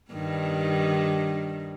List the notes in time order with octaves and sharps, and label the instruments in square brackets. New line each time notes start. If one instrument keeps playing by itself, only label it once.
[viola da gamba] G2 D#3 G3